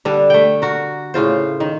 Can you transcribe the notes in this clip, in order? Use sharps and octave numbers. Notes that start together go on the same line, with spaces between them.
D3 G3 D4
A3 G5
F#4 A#4
A2 C#3 F4 C5
D#3